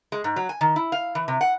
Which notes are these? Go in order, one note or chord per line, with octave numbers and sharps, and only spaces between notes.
G#3
G#2
F#3
G#5
D#3
E4
F5
E3
C3
F#5